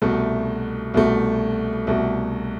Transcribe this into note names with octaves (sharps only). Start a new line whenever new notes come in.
C2 B2 A3
C2 B2 A3
C2 B2 A3